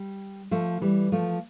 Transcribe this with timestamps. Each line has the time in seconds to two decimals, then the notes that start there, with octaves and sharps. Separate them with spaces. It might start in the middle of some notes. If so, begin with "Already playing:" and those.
Already playing: G3
0.51 F3 A3
0.81 E3 G3
1.12 F3 A3